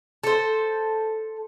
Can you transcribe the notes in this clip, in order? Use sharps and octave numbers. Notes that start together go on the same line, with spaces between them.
A4 C5